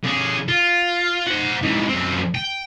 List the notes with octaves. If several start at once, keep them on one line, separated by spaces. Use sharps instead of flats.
D3 G#4
F4
C5 F#5
G#2 E3
F#2 C4
G5